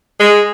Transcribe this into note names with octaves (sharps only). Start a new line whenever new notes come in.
G#3